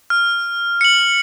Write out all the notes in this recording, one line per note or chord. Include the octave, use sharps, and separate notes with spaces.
F6
C#7 F#7